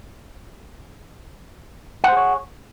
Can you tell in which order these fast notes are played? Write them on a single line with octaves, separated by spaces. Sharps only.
F#5 C5 G#4 C#5